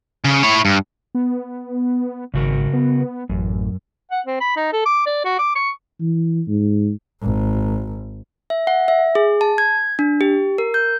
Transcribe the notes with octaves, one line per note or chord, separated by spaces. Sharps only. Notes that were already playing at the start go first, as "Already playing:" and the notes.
C#3
E4 C#5
G2
B3
G#1 C#3 F#4 A#4
B3
A1 F#2
F#5
C4
B5
D#4
A4
D6
D5
F#4
D6
C#6
E3
G#2
G#1
E5
F#5
E5
G#4
A5
G#6
D4
G4
A#4
G6